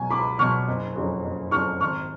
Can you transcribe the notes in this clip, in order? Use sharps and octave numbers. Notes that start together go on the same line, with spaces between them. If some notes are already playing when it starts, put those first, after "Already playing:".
Already playing: C#2 B2 F#3 G#5
C#2 B5 D6
B2 F#3 C#6 F6
F#1
F2 C#3 F#3
F#1
F2 C#3 F#3 C#6 F6
G#1 C#6 F6